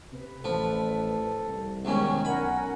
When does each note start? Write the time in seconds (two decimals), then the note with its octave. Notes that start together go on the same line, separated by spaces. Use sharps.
0.12 C3 B4
0.44 A1 F3 A4
1.48 C2
1.85 E2 G#2 D#3 C#4 G#5
2.25 B1 C#4 A#4 F#5 G#5 B5